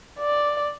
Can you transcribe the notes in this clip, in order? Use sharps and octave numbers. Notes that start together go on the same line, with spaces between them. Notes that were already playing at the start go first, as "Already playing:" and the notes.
D5